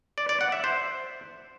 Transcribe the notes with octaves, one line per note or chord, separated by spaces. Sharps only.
D5
D5
F#5
E5
C5